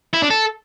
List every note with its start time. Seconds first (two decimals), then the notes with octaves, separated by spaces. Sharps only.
0.14 E4
0.22 D4
0.30 A4